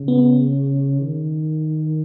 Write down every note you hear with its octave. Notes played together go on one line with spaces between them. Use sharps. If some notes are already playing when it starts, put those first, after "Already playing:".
Already playing: C#3
B3
D#3